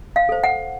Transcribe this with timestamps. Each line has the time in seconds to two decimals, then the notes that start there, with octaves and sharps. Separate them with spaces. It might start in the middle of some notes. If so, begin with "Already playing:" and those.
0.16 F5
0.29 A4 C5
0.44 F#5